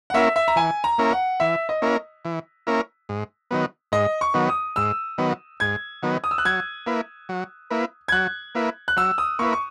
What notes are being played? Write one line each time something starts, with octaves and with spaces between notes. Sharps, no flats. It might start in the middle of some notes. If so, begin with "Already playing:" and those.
F#5
A#3 C#4 E4 A#4 E5
E5
A#5
E3 G#5
A#5
A#3 C#4 E4 A#4
F#5
E3 E5
D#5
A#3 C#4 E4 A#4
E3
A#3 C#4 E4 A#4
G#2
D#3 F#3 B3
G#2 D#5
C#6
D#3 F#3 B3
D#6
G#2 E6
D#3 F#3 B3
G#2 G#6
D#3 F#3 B3
D#6
E6
F#6
F#3 G#6
A#3 E4 B4
F#3
A#3 E4 B4
G#6
F#3 F#6
A#3 E4 B4
F#6
F#3 E6
D#6
A#3 E4 B4 C#6
C#6